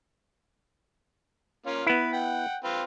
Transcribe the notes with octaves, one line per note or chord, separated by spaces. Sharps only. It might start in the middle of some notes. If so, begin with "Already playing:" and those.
A#3 C#4 F4
B3 E4 B4
F#5 G5
C4 F4 B4